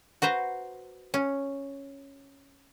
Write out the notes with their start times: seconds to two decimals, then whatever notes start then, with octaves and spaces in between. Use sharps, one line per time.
0.22 F#4 B4 C5 A#5
1.14 C#4